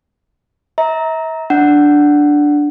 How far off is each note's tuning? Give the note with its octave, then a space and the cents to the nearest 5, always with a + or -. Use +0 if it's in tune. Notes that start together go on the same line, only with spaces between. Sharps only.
E5 -35 A#5 +0
D4 +0 F#5 +0